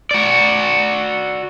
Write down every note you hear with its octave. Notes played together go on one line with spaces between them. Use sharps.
F#4 D5